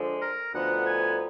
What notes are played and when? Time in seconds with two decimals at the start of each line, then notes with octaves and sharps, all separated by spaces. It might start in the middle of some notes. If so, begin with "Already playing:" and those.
Already playing: D3 F3 G#3
0.22 A#4
0.53 D2 D3 F3 B3 D#4 F#5
0.85 G#5